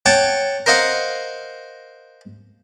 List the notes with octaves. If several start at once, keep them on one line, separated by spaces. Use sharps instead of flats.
C#5 F#5 G5 A5
A#4 C5 D#5 F5 F#5